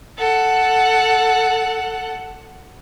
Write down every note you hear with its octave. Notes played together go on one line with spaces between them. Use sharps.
A4 F#5